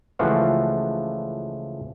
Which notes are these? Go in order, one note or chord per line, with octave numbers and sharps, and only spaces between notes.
C#2 E3 F3 A3 F#4 F5